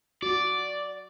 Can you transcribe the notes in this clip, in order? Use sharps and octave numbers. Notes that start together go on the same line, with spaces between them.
F#4 D5